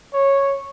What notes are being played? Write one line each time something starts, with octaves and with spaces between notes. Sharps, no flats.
C#5